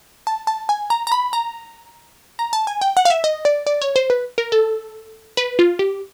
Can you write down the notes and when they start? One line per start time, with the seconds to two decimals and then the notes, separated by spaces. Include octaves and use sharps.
0.27 A5
0.47 A5
0.69 G#5
0.90 A#5
1.07 A#5
1.12 B5
1.33 A#5
2.39 A#5
2.53 A5
2.67 G#5
2.81 G5
2.97 F#5
3.05 F5
3.10 E5
3.24 D#5
3.45 D5
3.67 D5
3.82 C#5
3.96 C5
4.10 B4
4.38 A#4
4.52 A4
5.37 B4
5.59 F4
5.79 G4